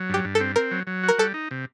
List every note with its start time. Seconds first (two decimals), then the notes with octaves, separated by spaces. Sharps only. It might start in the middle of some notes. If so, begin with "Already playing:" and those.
Already playing: F#3
0.09 G2 G4
0.24 G2
0.35 A4
0.40 C4
0.56 C4 A#4
0.71 F#3
0.87 F#3
1.03 F#4
1.08 A#4
1.18 G3 A4
1.34 D#4
1.51 C3